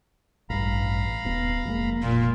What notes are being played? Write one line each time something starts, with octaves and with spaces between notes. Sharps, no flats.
A1 G2 F5 A#5 B5
D#1 B3
F1 G#3 A#3
A#2 F4